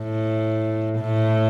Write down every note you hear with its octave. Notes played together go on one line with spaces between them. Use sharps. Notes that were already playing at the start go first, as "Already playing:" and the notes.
Already playing: A2
A2